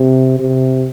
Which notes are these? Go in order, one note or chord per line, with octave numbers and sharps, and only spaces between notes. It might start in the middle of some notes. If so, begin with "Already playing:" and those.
Already playing: C3
C3